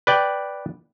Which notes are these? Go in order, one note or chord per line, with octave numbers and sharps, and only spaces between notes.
B4 D5 G5